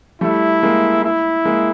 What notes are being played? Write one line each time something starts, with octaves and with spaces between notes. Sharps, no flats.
G3 A3 E4
G#3 A#3
E4
G#3 A#3